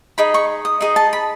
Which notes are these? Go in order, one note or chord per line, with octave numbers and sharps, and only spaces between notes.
D#4 G#4 D#5 B5
C#6
D#6
D#4 G#4 D#5
A5
B5